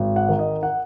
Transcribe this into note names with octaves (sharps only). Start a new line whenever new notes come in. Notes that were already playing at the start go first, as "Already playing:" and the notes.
Already playing: G#1
F#5
D#3
D#5
F#5